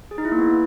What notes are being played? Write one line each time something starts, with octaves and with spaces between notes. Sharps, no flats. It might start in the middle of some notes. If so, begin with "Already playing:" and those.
G#4
D#4
E4
A#3
B3